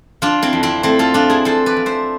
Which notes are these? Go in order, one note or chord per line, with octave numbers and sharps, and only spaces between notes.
F3 D4 F4
C4 E4
F2
C4 E4
A3 C4 E4
F4 A4
F3 D4 F4
E4 G#4
F3 A4 C5
B4 D5
F3
C5 E5